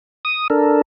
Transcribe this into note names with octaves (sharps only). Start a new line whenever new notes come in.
D#6
D4 A4 A#4